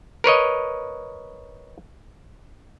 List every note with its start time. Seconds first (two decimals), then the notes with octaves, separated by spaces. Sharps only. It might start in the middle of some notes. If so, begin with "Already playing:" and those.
0.24 A#4 B4 C#5 D#5